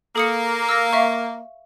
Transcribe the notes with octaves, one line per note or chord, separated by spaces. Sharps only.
A#3 A4 D#6 C#7
E6 F6 A#6
E5 F5 C#6